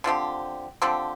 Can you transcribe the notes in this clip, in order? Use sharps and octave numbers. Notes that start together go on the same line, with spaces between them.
D3 F3 C4 G4
D3 F3 C4 G4